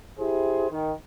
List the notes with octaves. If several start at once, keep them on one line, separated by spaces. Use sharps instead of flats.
E4 G4 G#4 C5
D#3